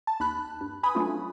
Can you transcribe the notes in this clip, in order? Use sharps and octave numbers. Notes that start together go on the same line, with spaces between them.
A5
D#2 B5 F#6
G2
B4 G#5 B5 D#6
F#3 A3 C#4 D4 F4